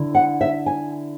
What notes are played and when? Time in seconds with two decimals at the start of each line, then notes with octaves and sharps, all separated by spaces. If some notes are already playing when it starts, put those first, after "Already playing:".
Already playing: D3 E4
0.15 F#5
0.41 E5
0.66 G#5